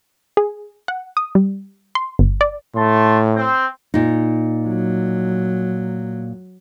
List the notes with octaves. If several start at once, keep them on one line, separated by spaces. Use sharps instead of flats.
G#4
F#5
D#6
G3
C6
G1
D5
A2 A3 A5 C6
C4
A#2 D#4
F#3